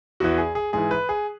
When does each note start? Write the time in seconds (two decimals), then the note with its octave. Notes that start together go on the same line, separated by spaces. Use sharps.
0.20 E2 E3 F#4
0.38 G#4
0.55 G#4
0.73 G#2 E3 G#4
0.91 B4
1.09 G#4